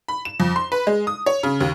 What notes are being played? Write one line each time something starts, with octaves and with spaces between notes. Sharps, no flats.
B5
E7
F2
C6
B4
G#3
D#6
C#5
C#3
D#2